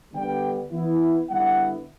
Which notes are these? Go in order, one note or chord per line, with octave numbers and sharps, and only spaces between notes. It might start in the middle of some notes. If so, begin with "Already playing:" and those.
D3 G3 B3 G5
E3 B3 E4
D3 G3 B3 E4 F#5